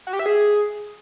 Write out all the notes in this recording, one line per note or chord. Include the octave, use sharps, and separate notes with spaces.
F#4
G4
E5
G#4